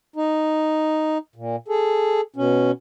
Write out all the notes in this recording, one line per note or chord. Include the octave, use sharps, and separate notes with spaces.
D#4
A#2
G#4 A4
B2 C#4